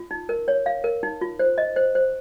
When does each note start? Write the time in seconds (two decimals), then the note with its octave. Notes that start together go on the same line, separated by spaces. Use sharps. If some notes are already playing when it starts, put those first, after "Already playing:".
Already playing: F4
0.11 D#4
0.29 A#4
0.48 C#5
0.66 F5
0.84 A#4
1.03 D#4
1.21 F4
1.39 C5
1.58 D#5
1.76 C5
1.95 C5